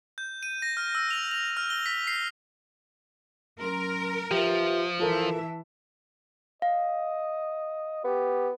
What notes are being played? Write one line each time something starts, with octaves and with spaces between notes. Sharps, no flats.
G6
D#7
A#6
F6
E6
F7
F7
F6
G7
B6
C7
F#3 C#4 A#4 C6
F3 F4 G4 B4 E5
E3 F4 A4 A#4 E5 A5
D#5 F5
B3 G4